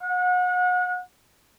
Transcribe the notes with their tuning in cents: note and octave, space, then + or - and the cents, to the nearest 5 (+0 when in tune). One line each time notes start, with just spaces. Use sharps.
F#5 -35